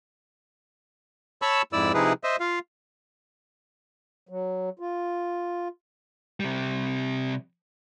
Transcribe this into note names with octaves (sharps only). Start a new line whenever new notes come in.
C#5 A5 B5 C#6 E6
F2 G#2 E4 D5 E6
C3 F3 D#4 E4 G#4 B4
C5 D#5 E5
F4 F5
F#3
F4
C3 G3